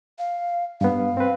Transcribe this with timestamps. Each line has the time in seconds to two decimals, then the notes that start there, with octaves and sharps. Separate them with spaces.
0.19 F5
0.81 G2 B3 F5
1.17 C4 B4